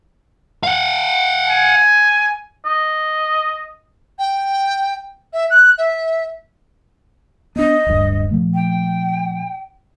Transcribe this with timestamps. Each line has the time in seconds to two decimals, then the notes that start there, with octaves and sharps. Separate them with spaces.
0.63 F5 F#5
1.48 G#5
2.65 D#5
4.19 G5
5.33 E5
5.50 F#6
5.78 E5
7.56 B3 D4 D#5
7.87 D1 G2
8.31 A#2 F3 A3
8.54 G5